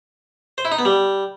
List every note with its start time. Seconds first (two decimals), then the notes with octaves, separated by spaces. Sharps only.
0.58 C5
0.65 E4
0.72 D#4
0.78 B3
0.85 G3